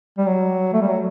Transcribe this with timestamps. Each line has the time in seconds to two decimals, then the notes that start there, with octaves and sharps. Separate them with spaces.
0.18 G3
0.27 F#3
0.73 A3
0.82 G3
0.90 F#3